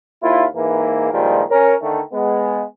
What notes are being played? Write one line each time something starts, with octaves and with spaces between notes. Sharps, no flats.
D#2 E4 F4
G#2 E3 A#3
G2 A#2 D#3 F3 G3 G#3
C#4 A#4
D3 D#3 A3
G#3 B3